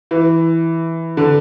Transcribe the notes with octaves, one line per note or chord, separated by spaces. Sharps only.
E3
D3